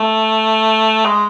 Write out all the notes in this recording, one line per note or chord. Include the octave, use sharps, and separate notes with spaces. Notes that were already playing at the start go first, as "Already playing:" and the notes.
Already playing: A3
G#3